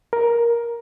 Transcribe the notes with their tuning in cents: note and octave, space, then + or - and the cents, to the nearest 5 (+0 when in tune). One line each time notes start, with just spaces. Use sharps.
A#4 +10